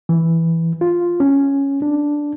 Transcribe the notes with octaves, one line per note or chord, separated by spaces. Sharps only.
E3
F4
C#4
D4